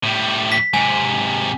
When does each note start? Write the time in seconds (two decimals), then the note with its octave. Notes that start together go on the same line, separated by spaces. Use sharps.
0.03 A2 G3
0.52 B6
0.74 G#2 C3 G#5